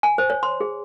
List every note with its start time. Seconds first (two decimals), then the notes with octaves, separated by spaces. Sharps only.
0.03 G#5
0.18 C5
0.30 C#5
0.43 C6
0.61 G#4